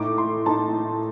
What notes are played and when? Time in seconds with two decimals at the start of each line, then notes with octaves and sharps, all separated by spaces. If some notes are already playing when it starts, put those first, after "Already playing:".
Already playing: A2 A3 D#4 D6
0.18 C6
0.46 A2 A3 D#4 A5